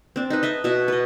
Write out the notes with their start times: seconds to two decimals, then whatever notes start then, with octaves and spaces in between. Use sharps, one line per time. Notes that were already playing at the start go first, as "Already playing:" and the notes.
0.16 C4 D4
0.30 D#4 B4
0.43 D#5 E5 A5
0.64 B2 F#4 E5
0.88 B4 D#5